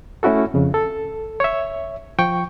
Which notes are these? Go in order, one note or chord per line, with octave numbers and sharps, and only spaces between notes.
A3 C#4 E4 F#4 A4
F2 C#3
A4
C#5 E5
F3 G5 C#6